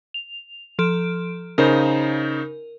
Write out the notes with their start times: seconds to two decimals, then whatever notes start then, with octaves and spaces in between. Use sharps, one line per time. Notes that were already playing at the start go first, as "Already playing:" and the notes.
0.14 F7
0.79 F3 A4 D7
1.58 C#3 D#4 A#4 C5